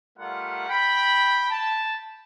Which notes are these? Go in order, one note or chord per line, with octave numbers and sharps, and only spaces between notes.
G3 A3 F4 A#4 F#5
G5 B5
A5